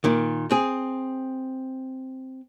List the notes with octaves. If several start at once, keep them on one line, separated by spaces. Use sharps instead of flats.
A#2 D#3
C4 G#4